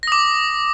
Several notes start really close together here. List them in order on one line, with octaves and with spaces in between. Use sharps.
A#6 D#6 D6